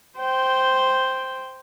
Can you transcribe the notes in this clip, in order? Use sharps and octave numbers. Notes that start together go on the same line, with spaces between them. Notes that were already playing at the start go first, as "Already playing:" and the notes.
C5 G5